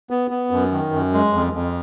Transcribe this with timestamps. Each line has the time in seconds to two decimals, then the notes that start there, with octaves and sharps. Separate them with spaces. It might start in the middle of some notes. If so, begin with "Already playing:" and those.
0.10 B3
0.31 B3
0.51 F#2
0.72 D#3
0.92 F#2
1.13 G#3
1.33 F2
1.53 F2